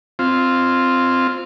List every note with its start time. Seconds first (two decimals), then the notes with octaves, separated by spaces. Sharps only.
0.19 C4 F4